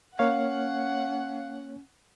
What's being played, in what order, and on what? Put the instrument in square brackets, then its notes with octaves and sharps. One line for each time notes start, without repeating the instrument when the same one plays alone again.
[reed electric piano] A#3 C#5 F6 [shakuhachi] C#4 [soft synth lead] F5 [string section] F#5